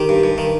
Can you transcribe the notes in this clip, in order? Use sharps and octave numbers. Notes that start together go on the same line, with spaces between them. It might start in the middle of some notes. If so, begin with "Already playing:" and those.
Already playing: D#3 G4
G2
G2
D#3